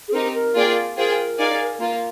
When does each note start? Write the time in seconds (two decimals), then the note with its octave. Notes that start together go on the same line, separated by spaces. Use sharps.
0.08 G#4
0.13 C4 D#4 G4 A#4
0.34 A#4
0.55 A#3 F4 G#4 D5 G5
0.97 F4 G#4 A#4 C5 G5
1.39 D#4 G#4 D5 F5 G#5
1.80 A#3 F4